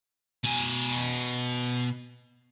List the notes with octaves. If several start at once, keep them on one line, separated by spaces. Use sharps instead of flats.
B2 G#5